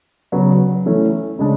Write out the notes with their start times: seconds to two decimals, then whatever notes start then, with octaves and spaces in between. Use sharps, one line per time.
0.32 C#3 F#3 B3
0.86 E3 A3 C#4
1.39 C#3 G#3 D4